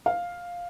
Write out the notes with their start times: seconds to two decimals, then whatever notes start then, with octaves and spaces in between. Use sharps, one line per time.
0.06 F5